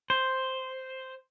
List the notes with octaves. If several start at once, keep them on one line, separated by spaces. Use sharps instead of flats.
C5